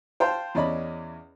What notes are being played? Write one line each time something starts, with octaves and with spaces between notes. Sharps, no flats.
C5 F5 G5 A5
E2 C#4 D5 D#5 B5